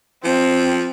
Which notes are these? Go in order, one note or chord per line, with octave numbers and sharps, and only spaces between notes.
F3 C4